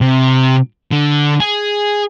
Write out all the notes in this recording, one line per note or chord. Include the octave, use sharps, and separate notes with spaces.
C3
D3
G#4